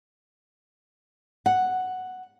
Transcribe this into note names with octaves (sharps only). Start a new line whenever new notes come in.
F#5